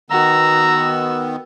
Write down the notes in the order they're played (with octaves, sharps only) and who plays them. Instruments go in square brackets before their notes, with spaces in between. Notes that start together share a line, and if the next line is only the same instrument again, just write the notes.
[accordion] D#3 B3 [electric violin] F#4 E6 [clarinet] A#5